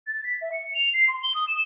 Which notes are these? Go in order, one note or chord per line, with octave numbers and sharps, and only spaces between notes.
A6
B6
E5
C#7
F7
C7
C6
G7
D#6
E7